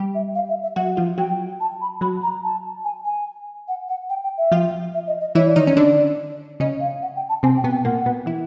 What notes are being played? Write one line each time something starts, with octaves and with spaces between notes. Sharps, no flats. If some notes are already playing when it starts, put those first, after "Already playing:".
Already playing: G3 G4
E5
F5
E5
E5
F#3 F#4 F#5
F3 F4
F#3 F#4 G5
A5
B5
F#3 F#4 B5
A#5
A5
G#5
G#5
F#5
F#5
G5
G5
E5
F3 F4
E5
D#5
D#5
E3 E4 C#5
D5
D#3 D#4 C#5
C#4
D3 D4 D5
C#3 C#4 D#5
F5
F#5
G5
A5
C3 C4 G#5
G5
B2 B3
G5
A#2 A#3 F#5
B2 B3
E3 E4